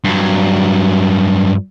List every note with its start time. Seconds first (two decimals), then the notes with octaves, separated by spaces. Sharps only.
0.04 G2 F#3